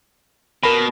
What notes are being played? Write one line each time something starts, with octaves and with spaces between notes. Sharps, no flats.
B2 A#4 B5